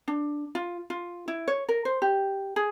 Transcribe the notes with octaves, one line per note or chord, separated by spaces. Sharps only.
D4
F4
F4
E4
C#5
A#4
C5
G4
G#4